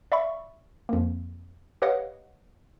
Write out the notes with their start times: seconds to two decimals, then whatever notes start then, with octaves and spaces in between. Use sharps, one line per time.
0.12 D5 E5 F5 B5 C#6
0.89 F2 A#3
1.82 G4 B4 C#5 D#5 F5 F#5